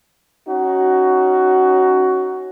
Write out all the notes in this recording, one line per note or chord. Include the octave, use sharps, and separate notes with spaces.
C#4 D#4 F#4